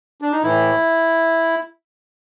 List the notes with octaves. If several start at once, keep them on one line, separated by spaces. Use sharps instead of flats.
D4
D#4
A2 E3 E4